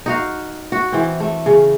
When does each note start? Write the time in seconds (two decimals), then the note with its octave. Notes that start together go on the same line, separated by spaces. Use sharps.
0.06 D#4 F#4 F5
0.72 F#4
0.92 E3 C4
1.20 A3
1.46 C#3